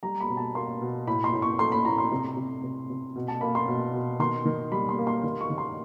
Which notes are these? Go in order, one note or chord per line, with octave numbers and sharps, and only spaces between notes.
G3 A#5
B5
B2
A5
A#3 C6
B2
A2 B5
C6
A2
C#6
A3 C6
B5
A2 A#5
C6
C3
C3
C3
C3
B2
A5
A#3 B5
C6
B2
B2
D#3 C6
D#3
G3 B5
C6
A#3
C6
D#3
C#6
D#3
C6